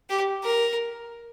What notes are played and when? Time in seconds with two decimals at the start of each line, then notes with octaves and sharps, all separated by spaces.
0.10 G4
0.44 A#4